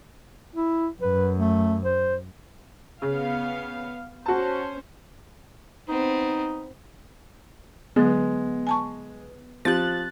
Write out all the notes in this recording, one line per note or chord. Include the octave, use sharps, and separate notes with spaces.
E4
F#2 B4
A3
C5
C#3 B3 F5
C#4 F#4 C5 A5
B3 C4 D#4
D3 F#3 G#3 B3
G#5 A5 C#6
F3 C4 G4 F#6 A6